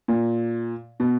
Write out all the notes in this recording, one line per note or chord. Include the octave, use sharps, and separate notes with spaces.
A#2
B2